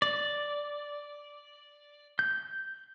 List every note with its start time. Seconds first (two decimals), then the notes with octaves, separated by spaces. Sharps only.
0.02 D5
2.19 G6